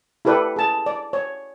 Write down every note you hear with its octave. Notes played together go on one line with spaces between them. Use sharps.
E4 G4 A4 B4 D5
G#4 A5
D5
C#5